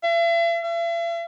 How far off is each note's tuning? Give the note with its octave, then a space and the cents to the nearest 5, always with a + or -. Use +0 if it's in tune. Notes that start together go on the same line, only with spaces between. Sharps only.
E5 +45
E5 +45